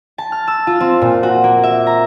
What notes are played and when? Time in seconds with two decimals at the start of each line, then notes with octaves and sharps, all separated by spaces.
0.18 A5
0.32 F6
0.48 E6
0.67 F4
0.80 C4
1.02 A#2
1.23 F#4
1.44 A#3
1.64 E5
1.87 A#5